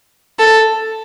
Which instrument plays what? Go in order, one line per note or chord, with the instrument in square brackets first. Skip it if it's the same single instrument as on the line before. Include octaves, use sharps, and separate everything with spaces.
[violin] A4